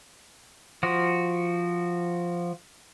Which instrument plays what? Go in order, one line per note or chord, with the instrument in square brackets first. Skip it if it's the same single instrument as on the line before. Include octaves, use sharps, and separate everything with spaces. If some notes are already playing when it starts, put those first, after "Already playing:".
[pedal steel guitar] F3 F#4